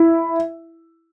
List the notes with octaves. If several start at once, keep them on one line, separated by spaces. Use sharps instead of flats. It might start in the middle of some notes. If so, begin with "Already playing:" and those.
Already playing: E4